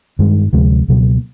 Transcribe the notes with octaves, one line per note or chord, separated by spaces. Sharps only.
G2 D#3 G#3
D2 C3 F3 G#3
C#2 B2 F#3 A#3